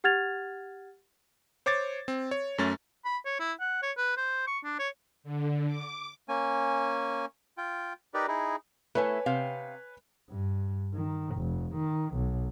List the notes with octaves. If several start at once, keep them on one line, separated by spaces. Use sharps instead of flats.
G4 F#5 F6 G#6 A6 F7
C5 C#5 D6 G#6 A6
C4
C#5
F#2 A3 C#4 A6
B5
C#5
E4
F#5
C#5
B4
C5
C#6
D4
C#5
D3
D6
A#3 C#4 G#5
F4 G5
D#4 G4 A#4 B4 D5
D#4 E4 G#4
A3 E4 A4 B4 C#5 G#5
C3 F5 G5
G2
D#3
F1
D#3
B1